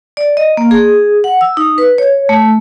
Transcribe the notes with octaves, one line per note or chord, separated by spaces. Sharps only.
D5
D#5
A#3
G#4
F#5
E6
D#4
B4
C#5
A3